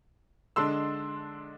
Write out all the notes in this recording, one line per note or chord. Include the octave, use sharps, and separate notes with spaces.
D3 G#3 D4 C6 E6